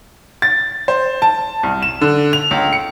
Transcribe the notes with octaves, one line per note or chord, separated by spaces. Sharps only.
A6
C5
A5
C2
E7
D3
F7
C#2
C#7